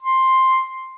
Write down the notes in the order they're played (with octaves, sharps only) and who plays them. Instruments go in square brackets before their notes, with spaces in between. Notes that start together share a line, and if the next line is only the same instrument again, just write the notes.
[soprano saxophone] C6